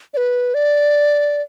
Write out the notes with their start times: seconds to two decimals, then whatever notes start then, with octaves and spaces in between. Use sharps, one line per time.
0.14 D5
0.17 B4
0.54 D5